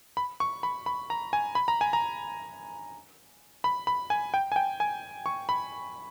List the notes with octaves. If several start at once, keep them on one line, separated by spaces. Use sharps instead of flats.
B5
C#6
B5
B5
A#5
G#5
B5
A#5
G#5
A#5
B5
B5
G#5
G5
G#5
G5
G#5
C#6
B5